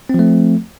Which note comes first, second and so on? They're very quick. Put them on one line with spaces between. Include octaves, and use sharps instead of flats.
C4 F3 A3